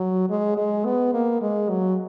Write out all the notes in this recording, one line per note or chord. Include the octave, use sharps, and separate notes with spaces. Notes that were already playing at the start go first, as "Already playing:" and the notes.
Already playing: F#3
G#3
G#3
B3
A#3
G#3
F#3